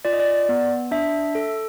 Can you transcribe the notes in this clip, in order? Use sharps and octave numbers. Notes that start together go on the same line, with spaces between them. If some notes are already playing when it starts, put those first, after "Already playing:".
F4 D5
D#5
D5
B3
D4 E5
A4